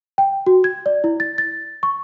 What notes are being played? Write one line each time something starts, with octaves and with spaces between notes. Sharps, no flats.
G5
F#4
G#6
D5
E4
A6
A6
C#6